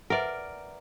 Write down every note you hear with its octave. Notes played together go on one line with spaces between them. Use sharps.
A#4 B4 D5 E5 F#5